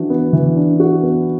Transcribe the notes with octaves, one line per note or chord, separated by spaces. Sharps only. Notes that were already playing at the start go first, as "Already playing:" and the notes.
Already playing: E3 D4 F#4
B3
E3
D4
F#4
B3